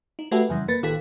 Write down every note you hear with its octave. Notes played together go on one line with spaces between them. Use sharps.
D#4
A3 F#4 G4 A4 B4 E5
F2 C#3 E3 G3
A#3 B4 A6
A1 D#3 F4 G4 A4 B6